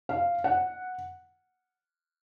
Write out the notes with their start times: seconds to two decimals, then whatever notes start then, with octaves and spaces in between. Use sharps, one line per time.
0.09 F5
0.44 F#5